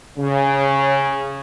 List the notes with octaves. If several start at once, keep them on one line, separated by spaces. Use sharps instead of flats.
C#3